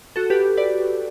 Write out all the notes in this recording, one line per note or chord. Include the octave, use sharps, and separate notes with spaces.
F#4 A4
G4 B4
B4 D5